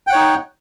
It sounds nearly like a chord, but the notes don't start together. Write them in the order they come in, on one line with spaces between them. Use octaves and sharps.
G5 F#5 C#5 D#4